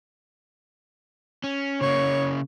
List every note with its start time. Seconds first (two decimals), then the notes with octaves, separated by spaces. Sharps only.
1.44 C#4
1.81 C#3 A#3 C#5